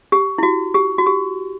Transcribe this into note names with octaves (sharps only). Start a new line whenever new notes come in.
G4
E4
F#4
G4
F#4
G4